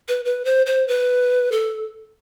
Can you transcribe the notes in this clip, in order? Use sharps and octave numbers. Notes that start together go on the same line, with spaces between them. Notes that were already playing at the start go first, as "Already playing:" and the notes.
B4
B4
C5
C5
B4
A4